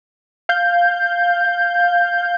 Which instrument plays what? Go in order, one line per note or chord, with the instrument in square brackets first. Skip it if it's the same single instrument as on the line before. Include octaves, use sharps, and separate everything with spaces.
[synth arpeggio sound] F5 G6